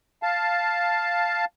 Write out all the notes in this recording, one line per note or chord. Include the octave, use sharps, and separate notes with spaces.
F5 A5